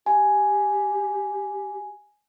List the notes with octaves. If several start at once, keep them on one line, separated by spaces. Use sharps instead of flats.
G4 G#5